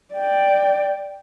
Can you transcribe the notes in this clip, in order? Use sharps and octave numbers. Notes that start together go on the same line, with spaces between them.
D5 G5